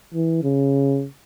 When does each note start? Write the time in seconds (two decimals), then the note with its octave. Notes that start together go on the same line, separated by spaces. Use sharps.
0.14 E3
0.43 C#3